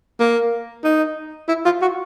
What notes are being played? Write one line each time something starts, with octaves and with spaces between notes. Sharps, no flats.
A#3
D#4
E4
F4
F#4